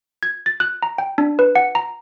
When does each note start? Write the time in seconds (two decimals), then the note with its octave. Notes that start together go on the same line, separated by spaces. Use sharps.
0.23 G#6
0.46 A6
0.60 F#6
0.83 A#5
0.98 G5
1.18 D4
1.39 B4
1.55 F#5
1.75 A#5